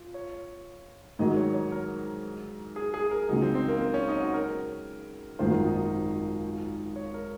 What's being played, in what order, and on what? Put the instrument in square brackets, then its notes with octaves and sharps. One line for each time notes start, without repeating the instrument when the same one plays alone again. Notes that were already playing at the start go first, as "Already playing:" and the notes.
Already playing: [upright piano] F4
[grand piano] C#5
[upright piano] G#2 D#3 F#3 [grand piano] D#5
[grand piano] C#5
C#5
A#4
G#4
G#4
A#4
[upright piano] C#2 C#3 F#3 [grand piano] D#4
[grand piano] C4
C4
A#3
C4
C#4
D#4
F#4
A#4
[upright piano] G#1 F#2 D#3 A#3 F4 [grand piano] C5
[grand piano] D#4
C#5
A#4